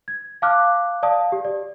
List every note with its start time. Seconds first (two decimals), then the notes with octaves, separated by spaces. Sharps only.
0.08 G#6
0.42 F5 A5 D6 F6 F#6
1.03 D5 F5 A5 D#6
1.32 G4
1.45 D5